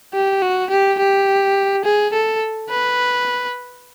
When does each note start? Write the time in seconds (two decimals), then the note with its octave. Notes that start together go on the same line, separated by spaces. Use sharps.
0.14 G4
0.42 F#4
0.70 G4
0.99 G4
1.85 G#4
2.13 A4
2.70 B4